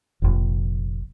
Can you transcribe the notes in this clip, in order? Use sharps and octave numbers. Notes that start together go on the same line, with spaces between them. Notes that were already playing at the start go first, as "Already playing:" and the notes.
F1 A#1